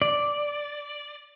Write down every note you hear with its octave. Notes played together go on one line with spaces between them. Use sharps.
D5